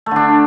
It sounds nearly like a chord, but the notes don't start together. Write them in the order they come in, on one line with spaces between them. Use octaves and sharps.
A3 D3 D4